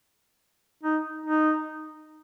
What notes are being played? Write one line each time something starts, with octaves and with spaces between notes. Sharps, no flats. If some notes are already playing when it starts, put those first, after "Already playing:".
D#4
D#4